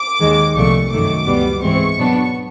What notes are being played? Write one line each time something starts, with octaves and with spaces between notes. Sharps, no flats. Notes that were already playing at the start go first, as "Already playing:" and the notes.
Already playing: D6
D#2 D#3 G#3
C2 A#2 F3 A3 C#6
F#2 D#3 F#3 A3 D6
C#2 B2 G3 B3
G#2 E3 G#3 C4 C#6
B2 F#3 B3 D4